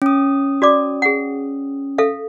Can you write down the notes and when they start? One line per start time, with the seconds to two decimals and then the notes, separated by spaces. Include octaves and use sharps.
0.02 C#4 D#6
0.62 F#4 D5 D6
1.02 G#4 F#5
1.98 A4 E5 F5